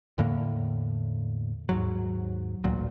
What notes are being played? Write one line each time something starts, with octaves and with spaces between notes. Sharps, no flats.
E2 A2 D3 A#3
D#2 G#2 F#3
A1 D2 A#2 F#3